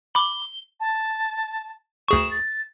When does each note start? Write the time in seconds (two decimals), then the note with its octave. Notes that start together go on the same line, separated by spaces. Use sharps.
0.15 B5 D6 G7
0.80 A5
2.08 D2 G#4 C#6 E7
2.31 A6